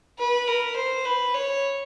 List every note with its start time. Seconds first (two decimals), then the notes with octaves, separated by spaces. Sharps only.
0.19 B4
0.48 A#4
0.76 C5
1.05 B4
1.34 C#5